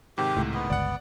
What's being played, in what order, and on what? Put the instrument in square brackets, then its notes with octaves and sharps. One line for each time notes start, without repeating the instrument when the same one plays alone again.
[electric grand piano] G#2 C3 D#3 [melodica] G4
[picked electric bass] C#2 A2
[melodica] B3
[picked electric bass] G1 C#2 [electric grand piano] D5 F#5